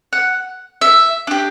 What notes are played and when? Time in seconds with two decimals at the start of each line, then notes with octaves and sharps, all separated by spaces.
0.13 F#5
0.81 E5
1.27 D4 G4